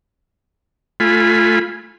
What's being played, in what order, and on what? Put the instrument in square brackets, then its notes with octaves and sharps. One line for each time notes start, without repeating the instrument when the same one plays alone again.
[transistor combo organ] A3 F4 G#5 B5